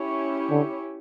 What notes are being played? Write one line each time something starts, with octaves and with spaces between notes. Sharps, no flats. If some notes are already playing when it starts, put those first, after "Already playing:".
Already playing: C#4 E4 G4 C#5
D3